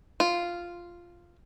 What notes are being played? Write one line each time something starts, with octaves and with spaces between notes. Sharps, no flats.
F4